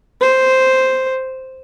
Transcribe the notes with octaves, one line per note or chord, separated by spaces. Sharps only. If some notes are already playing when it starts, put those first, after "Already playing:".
C5